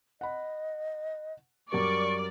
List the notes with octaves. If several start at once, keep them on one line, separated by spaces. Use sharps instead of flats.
D#5 F#5 B5
F#2 G3 A#4 D5 C#6